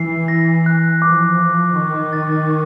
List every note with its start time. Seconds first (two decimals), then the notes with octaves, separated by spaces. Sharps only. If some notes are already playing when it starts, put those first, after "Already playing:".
Already playing: E3 C7
0.28 A#6
0.66 F#6
1.02 F3 D6
1.39 F3 D6
1.76 D#3 C#6
2.13 A6
2.49 C#6